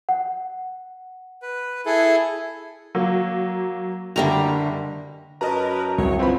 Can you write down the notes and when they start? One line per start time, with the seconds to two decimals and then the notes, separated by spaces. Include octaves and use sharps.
0.09 F#5
1.42 B4
1.86 E4 G#4 A4
2.95 F#3 A#3
4.16 F#1 D3 G3 A3 A#4 A#5
5.41 F#2 A#4 B4 D#5 A5 A#5
5.98 C2 F#3 C#5
6.19 D2 G2 C#3 F3 C4 B4 B5